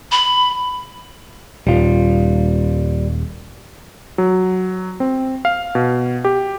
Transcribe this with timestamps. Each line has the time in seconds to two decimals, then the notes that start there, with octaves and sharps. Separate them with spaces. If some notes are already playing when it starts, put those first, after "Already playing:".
0.12 B5
1.67 D#1 G3 F4
4.18 F#3
5.00 C4
5.45 F5
5.75 B2
6.25 G4